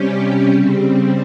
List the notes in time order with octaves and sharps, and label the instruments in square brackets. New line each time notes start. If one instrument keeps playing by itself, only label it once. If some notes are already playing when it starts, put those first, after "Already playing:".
Already playing: [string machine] C3 G3 C#4 G4
C#3 G3 C4